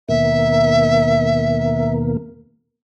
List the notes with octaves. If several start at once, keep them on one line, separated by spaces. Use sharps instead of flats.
D#2 B2 A#3 E5